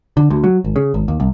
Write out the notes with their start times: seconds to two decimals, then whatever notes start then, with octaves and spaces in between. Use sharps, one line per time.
0.17 D3
0.30 D2
0.44 F#3
0.64 G#1
0.76 C#3
0.94 G#1
1.08 D#2
1.20 C2